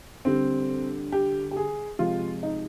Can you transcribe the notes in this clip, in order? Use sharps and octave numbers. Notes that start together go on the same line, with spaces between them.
D3 G3 C4
G4
G4
G#4
C3 F3 G#3 F4
D#4